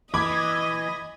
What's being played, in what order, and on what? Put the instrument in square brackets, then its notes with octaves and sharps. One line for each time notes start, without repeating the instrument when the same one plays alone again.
[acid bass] E3 [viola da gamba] D#5 [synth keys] B5 G#6 [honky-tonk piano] D6